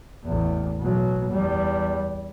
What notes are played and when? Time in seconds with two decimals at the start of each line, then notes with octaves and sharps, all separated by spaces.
0.24 A1 E2
0.81 B2 F#3
1.31 E2 G3